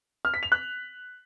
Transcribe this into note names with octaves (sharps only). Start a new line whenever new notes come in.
F6
B6
F7
F#6